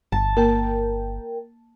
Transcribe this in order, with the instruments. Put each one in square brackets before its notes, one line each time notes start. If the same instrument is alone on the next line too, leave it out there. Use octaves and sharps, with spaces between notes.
[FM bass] G1 [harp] A5
[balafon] A#3 [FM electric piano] A#4 G5